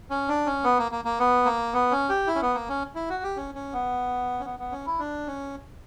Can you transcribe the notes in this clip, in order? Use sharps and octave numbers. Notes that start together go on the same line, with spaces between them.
C#4
D4
C#4
B3
A#3
A#3
A#3
B3
A#3
B3
C#4
G4
E4
C#4
B3
A#3
C#4
E4
F#4
G4
C#4
C#4
B3
C#4
B3
B3
C#4
E4
D4
C#4